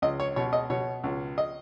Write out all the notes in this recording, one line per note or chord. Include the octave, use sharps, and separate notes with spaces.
C#2 D#5
C#5
B2 C#5
D#5
B2 C#5
C#2
D#5